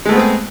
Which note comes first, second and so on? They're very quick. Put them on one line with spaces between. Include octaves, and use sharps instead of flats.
G#3 A3 B3 C4 G#4